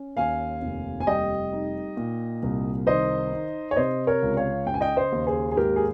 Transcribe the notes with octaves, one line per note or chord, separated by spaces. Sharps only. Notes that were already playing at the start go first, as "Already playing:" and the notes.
Already playing: C#4
D#2 F5 G#5
F1
G#5
G3 D#5 G5
D#4
A#2
C2
D#3 C5 D#5
D#4
C#5
C3 C5 D#5
A#4 C#5
C#2
C#5 F5
C#3 G5
G#5
D#5 G5
C5 D#5
D#2
G#4 C5
G#4
G#2 G4 A#4
G#4